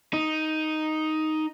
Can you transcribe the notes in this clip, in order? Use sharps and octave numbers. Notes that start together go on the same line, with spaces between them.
D#4